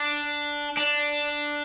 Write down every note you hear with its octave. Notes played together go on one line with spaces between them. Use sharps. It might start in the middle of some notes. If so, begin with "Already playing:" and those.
Already playing: D4
D4